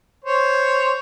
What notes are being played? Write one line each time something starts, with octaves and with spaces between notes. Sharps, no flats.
C5 C#5